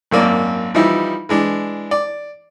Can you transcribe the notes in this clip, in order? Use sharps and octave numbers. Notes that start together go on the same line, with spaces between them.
G#1 F#2 A#3 D5
E3 F3 G3 D#4 E4
E3 G#3 D4
D5